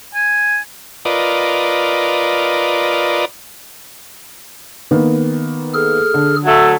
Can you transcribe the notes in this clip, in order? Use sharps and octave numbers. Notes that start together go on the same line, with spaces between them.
G#5
F4 A#4 B4 D5 D#5
D#3 A#3 B3
G#4 A4 F6
D3
F#3 A3